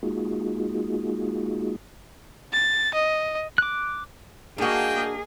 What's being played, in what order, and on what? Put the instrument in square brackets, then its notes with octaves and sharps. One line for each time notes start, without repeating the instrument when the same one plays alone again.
[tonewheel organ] G#3 A#3 D#4 F4 F#4 G#4
[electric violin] A6
D#5
[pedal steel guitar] D6 F#6
[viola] A#3 D#5 [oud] D4 F#4 [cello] G#4 [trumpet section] F5 G5